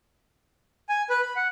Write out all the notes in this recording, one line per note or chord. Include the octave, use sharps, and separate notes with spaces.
G#5
B4
B5
F#5